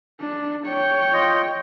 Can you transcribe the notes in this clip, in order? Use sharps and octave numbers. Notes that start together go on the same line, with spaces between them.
D4
C#5 G5
F4 D#5